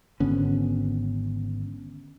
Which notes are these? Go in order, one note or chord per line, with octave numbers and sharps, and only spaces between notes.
G#1 D3 B3 C#4